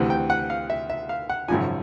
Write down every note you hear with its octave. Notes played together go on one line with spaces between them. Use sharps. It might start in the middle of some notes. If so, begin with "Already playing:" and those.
Already playing: D2 C3 E3
G5
F#5
F5
E5
E5
F5
F#5
G#1 F#2 C#3 F3 G#5